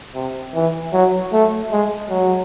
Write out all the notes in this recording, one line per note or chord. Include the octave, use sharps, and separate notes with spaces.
C3
E3
F#3
A3
G#3
F#3